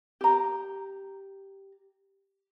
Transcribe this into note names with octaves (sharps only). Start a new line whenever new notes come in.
G4 A#5